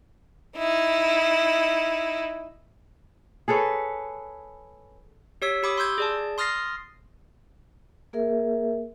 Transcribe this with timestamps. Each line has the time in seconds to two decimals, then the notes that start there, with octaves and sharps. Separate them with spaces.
0.58 D#4 E4
3.48 G#4 A4 B4 C#5
5.42 G4 C#5 E6 B6
5.63 G4 B5 D6 D#6
5.78 C6 E6 G6 G#6
5.98 G#4 D5 A5
6.38 C6 D#6 F6 A6 A#6 C7
8.13 A#3 G#4 A#4 E5